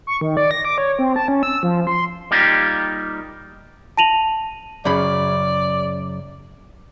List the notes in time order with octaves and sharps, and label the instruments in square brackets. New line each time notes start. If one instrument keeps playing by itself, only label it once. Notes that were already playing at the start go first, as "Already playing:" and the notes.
[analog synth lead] C#6
D#3
D5
A#6
D6
C#5
C4
A5
C#4
E6
F3
C6
[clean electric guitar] G3 A#3 D#4 F4 G4
[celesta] A5 A#6 D#7 F7 F#7
[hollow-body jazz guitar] F#2 C#3 B5 [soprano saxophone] D5